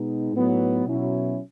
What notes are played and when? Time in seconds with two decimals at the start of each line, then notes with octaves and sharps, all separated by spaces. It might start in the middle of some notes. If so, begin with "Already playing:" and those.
Already playing: B2 G#3 B3 D#4
0.32 A2 F#3 B3 D#4
0.85 B2 F#3 C#4 E4